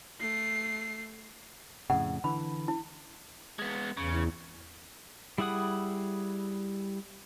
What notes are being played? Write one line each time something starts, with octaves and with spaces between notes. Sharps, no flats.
A3 C7
F2 A2 C#3 F#5
D3 E3 B5
E4
G#3 B3
E2 C#3
G3 E4 G#4 F#5 D#6